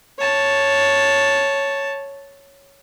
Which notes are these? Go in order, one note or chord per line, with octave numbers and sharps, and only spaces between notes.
C#5 A5